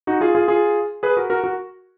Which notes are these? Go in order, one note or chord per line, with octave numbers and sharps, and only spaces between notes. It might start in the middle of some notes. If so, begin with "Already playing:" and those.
D#4 F#4
F4 G#4
F4 G#4
F4 G#4
G#4 B4
F#4 A#4
F#4 A#4
F#4 A#4